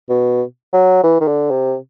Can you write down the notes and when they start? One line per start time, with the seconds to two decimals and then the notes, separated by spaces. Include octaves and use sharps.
0.09 B2
0.73 F#3
1.03 E3
1.20 D#3
1.27 D3
1.51 C3